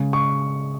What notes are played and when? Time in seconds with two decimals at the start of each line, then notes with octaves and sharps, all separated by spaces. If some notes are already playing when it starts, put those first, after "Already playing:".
Already playing: C#3 G#3
0.13 C#6